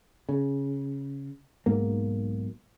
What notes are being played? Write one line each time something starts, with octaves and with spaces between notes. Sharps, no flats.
C#3
B1 G#2 F#3 A#3